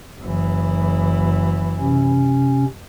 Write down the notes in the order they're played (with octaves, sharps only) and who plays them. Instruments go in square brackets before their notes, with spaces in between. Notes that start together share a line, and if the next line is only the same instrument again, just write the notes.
[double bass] F#1 E3
[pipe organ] C3 C#4